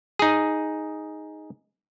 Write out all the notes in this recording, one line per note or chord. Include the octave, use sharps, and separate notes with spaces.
D#4 G#4